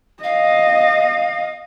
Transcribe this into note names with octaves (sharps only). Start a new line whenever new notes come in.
D#5 F5